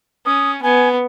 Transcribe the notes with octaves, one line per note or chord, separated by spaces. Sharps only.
C#4 D#6
B3 G#5